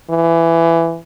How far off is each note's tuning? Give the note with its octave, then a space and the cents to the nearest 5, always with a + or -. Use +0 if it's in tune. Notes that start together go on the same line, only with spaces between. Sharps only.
E3 +15